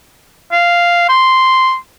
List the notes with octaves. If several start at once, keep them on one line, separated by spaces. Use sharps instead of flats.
F5
C6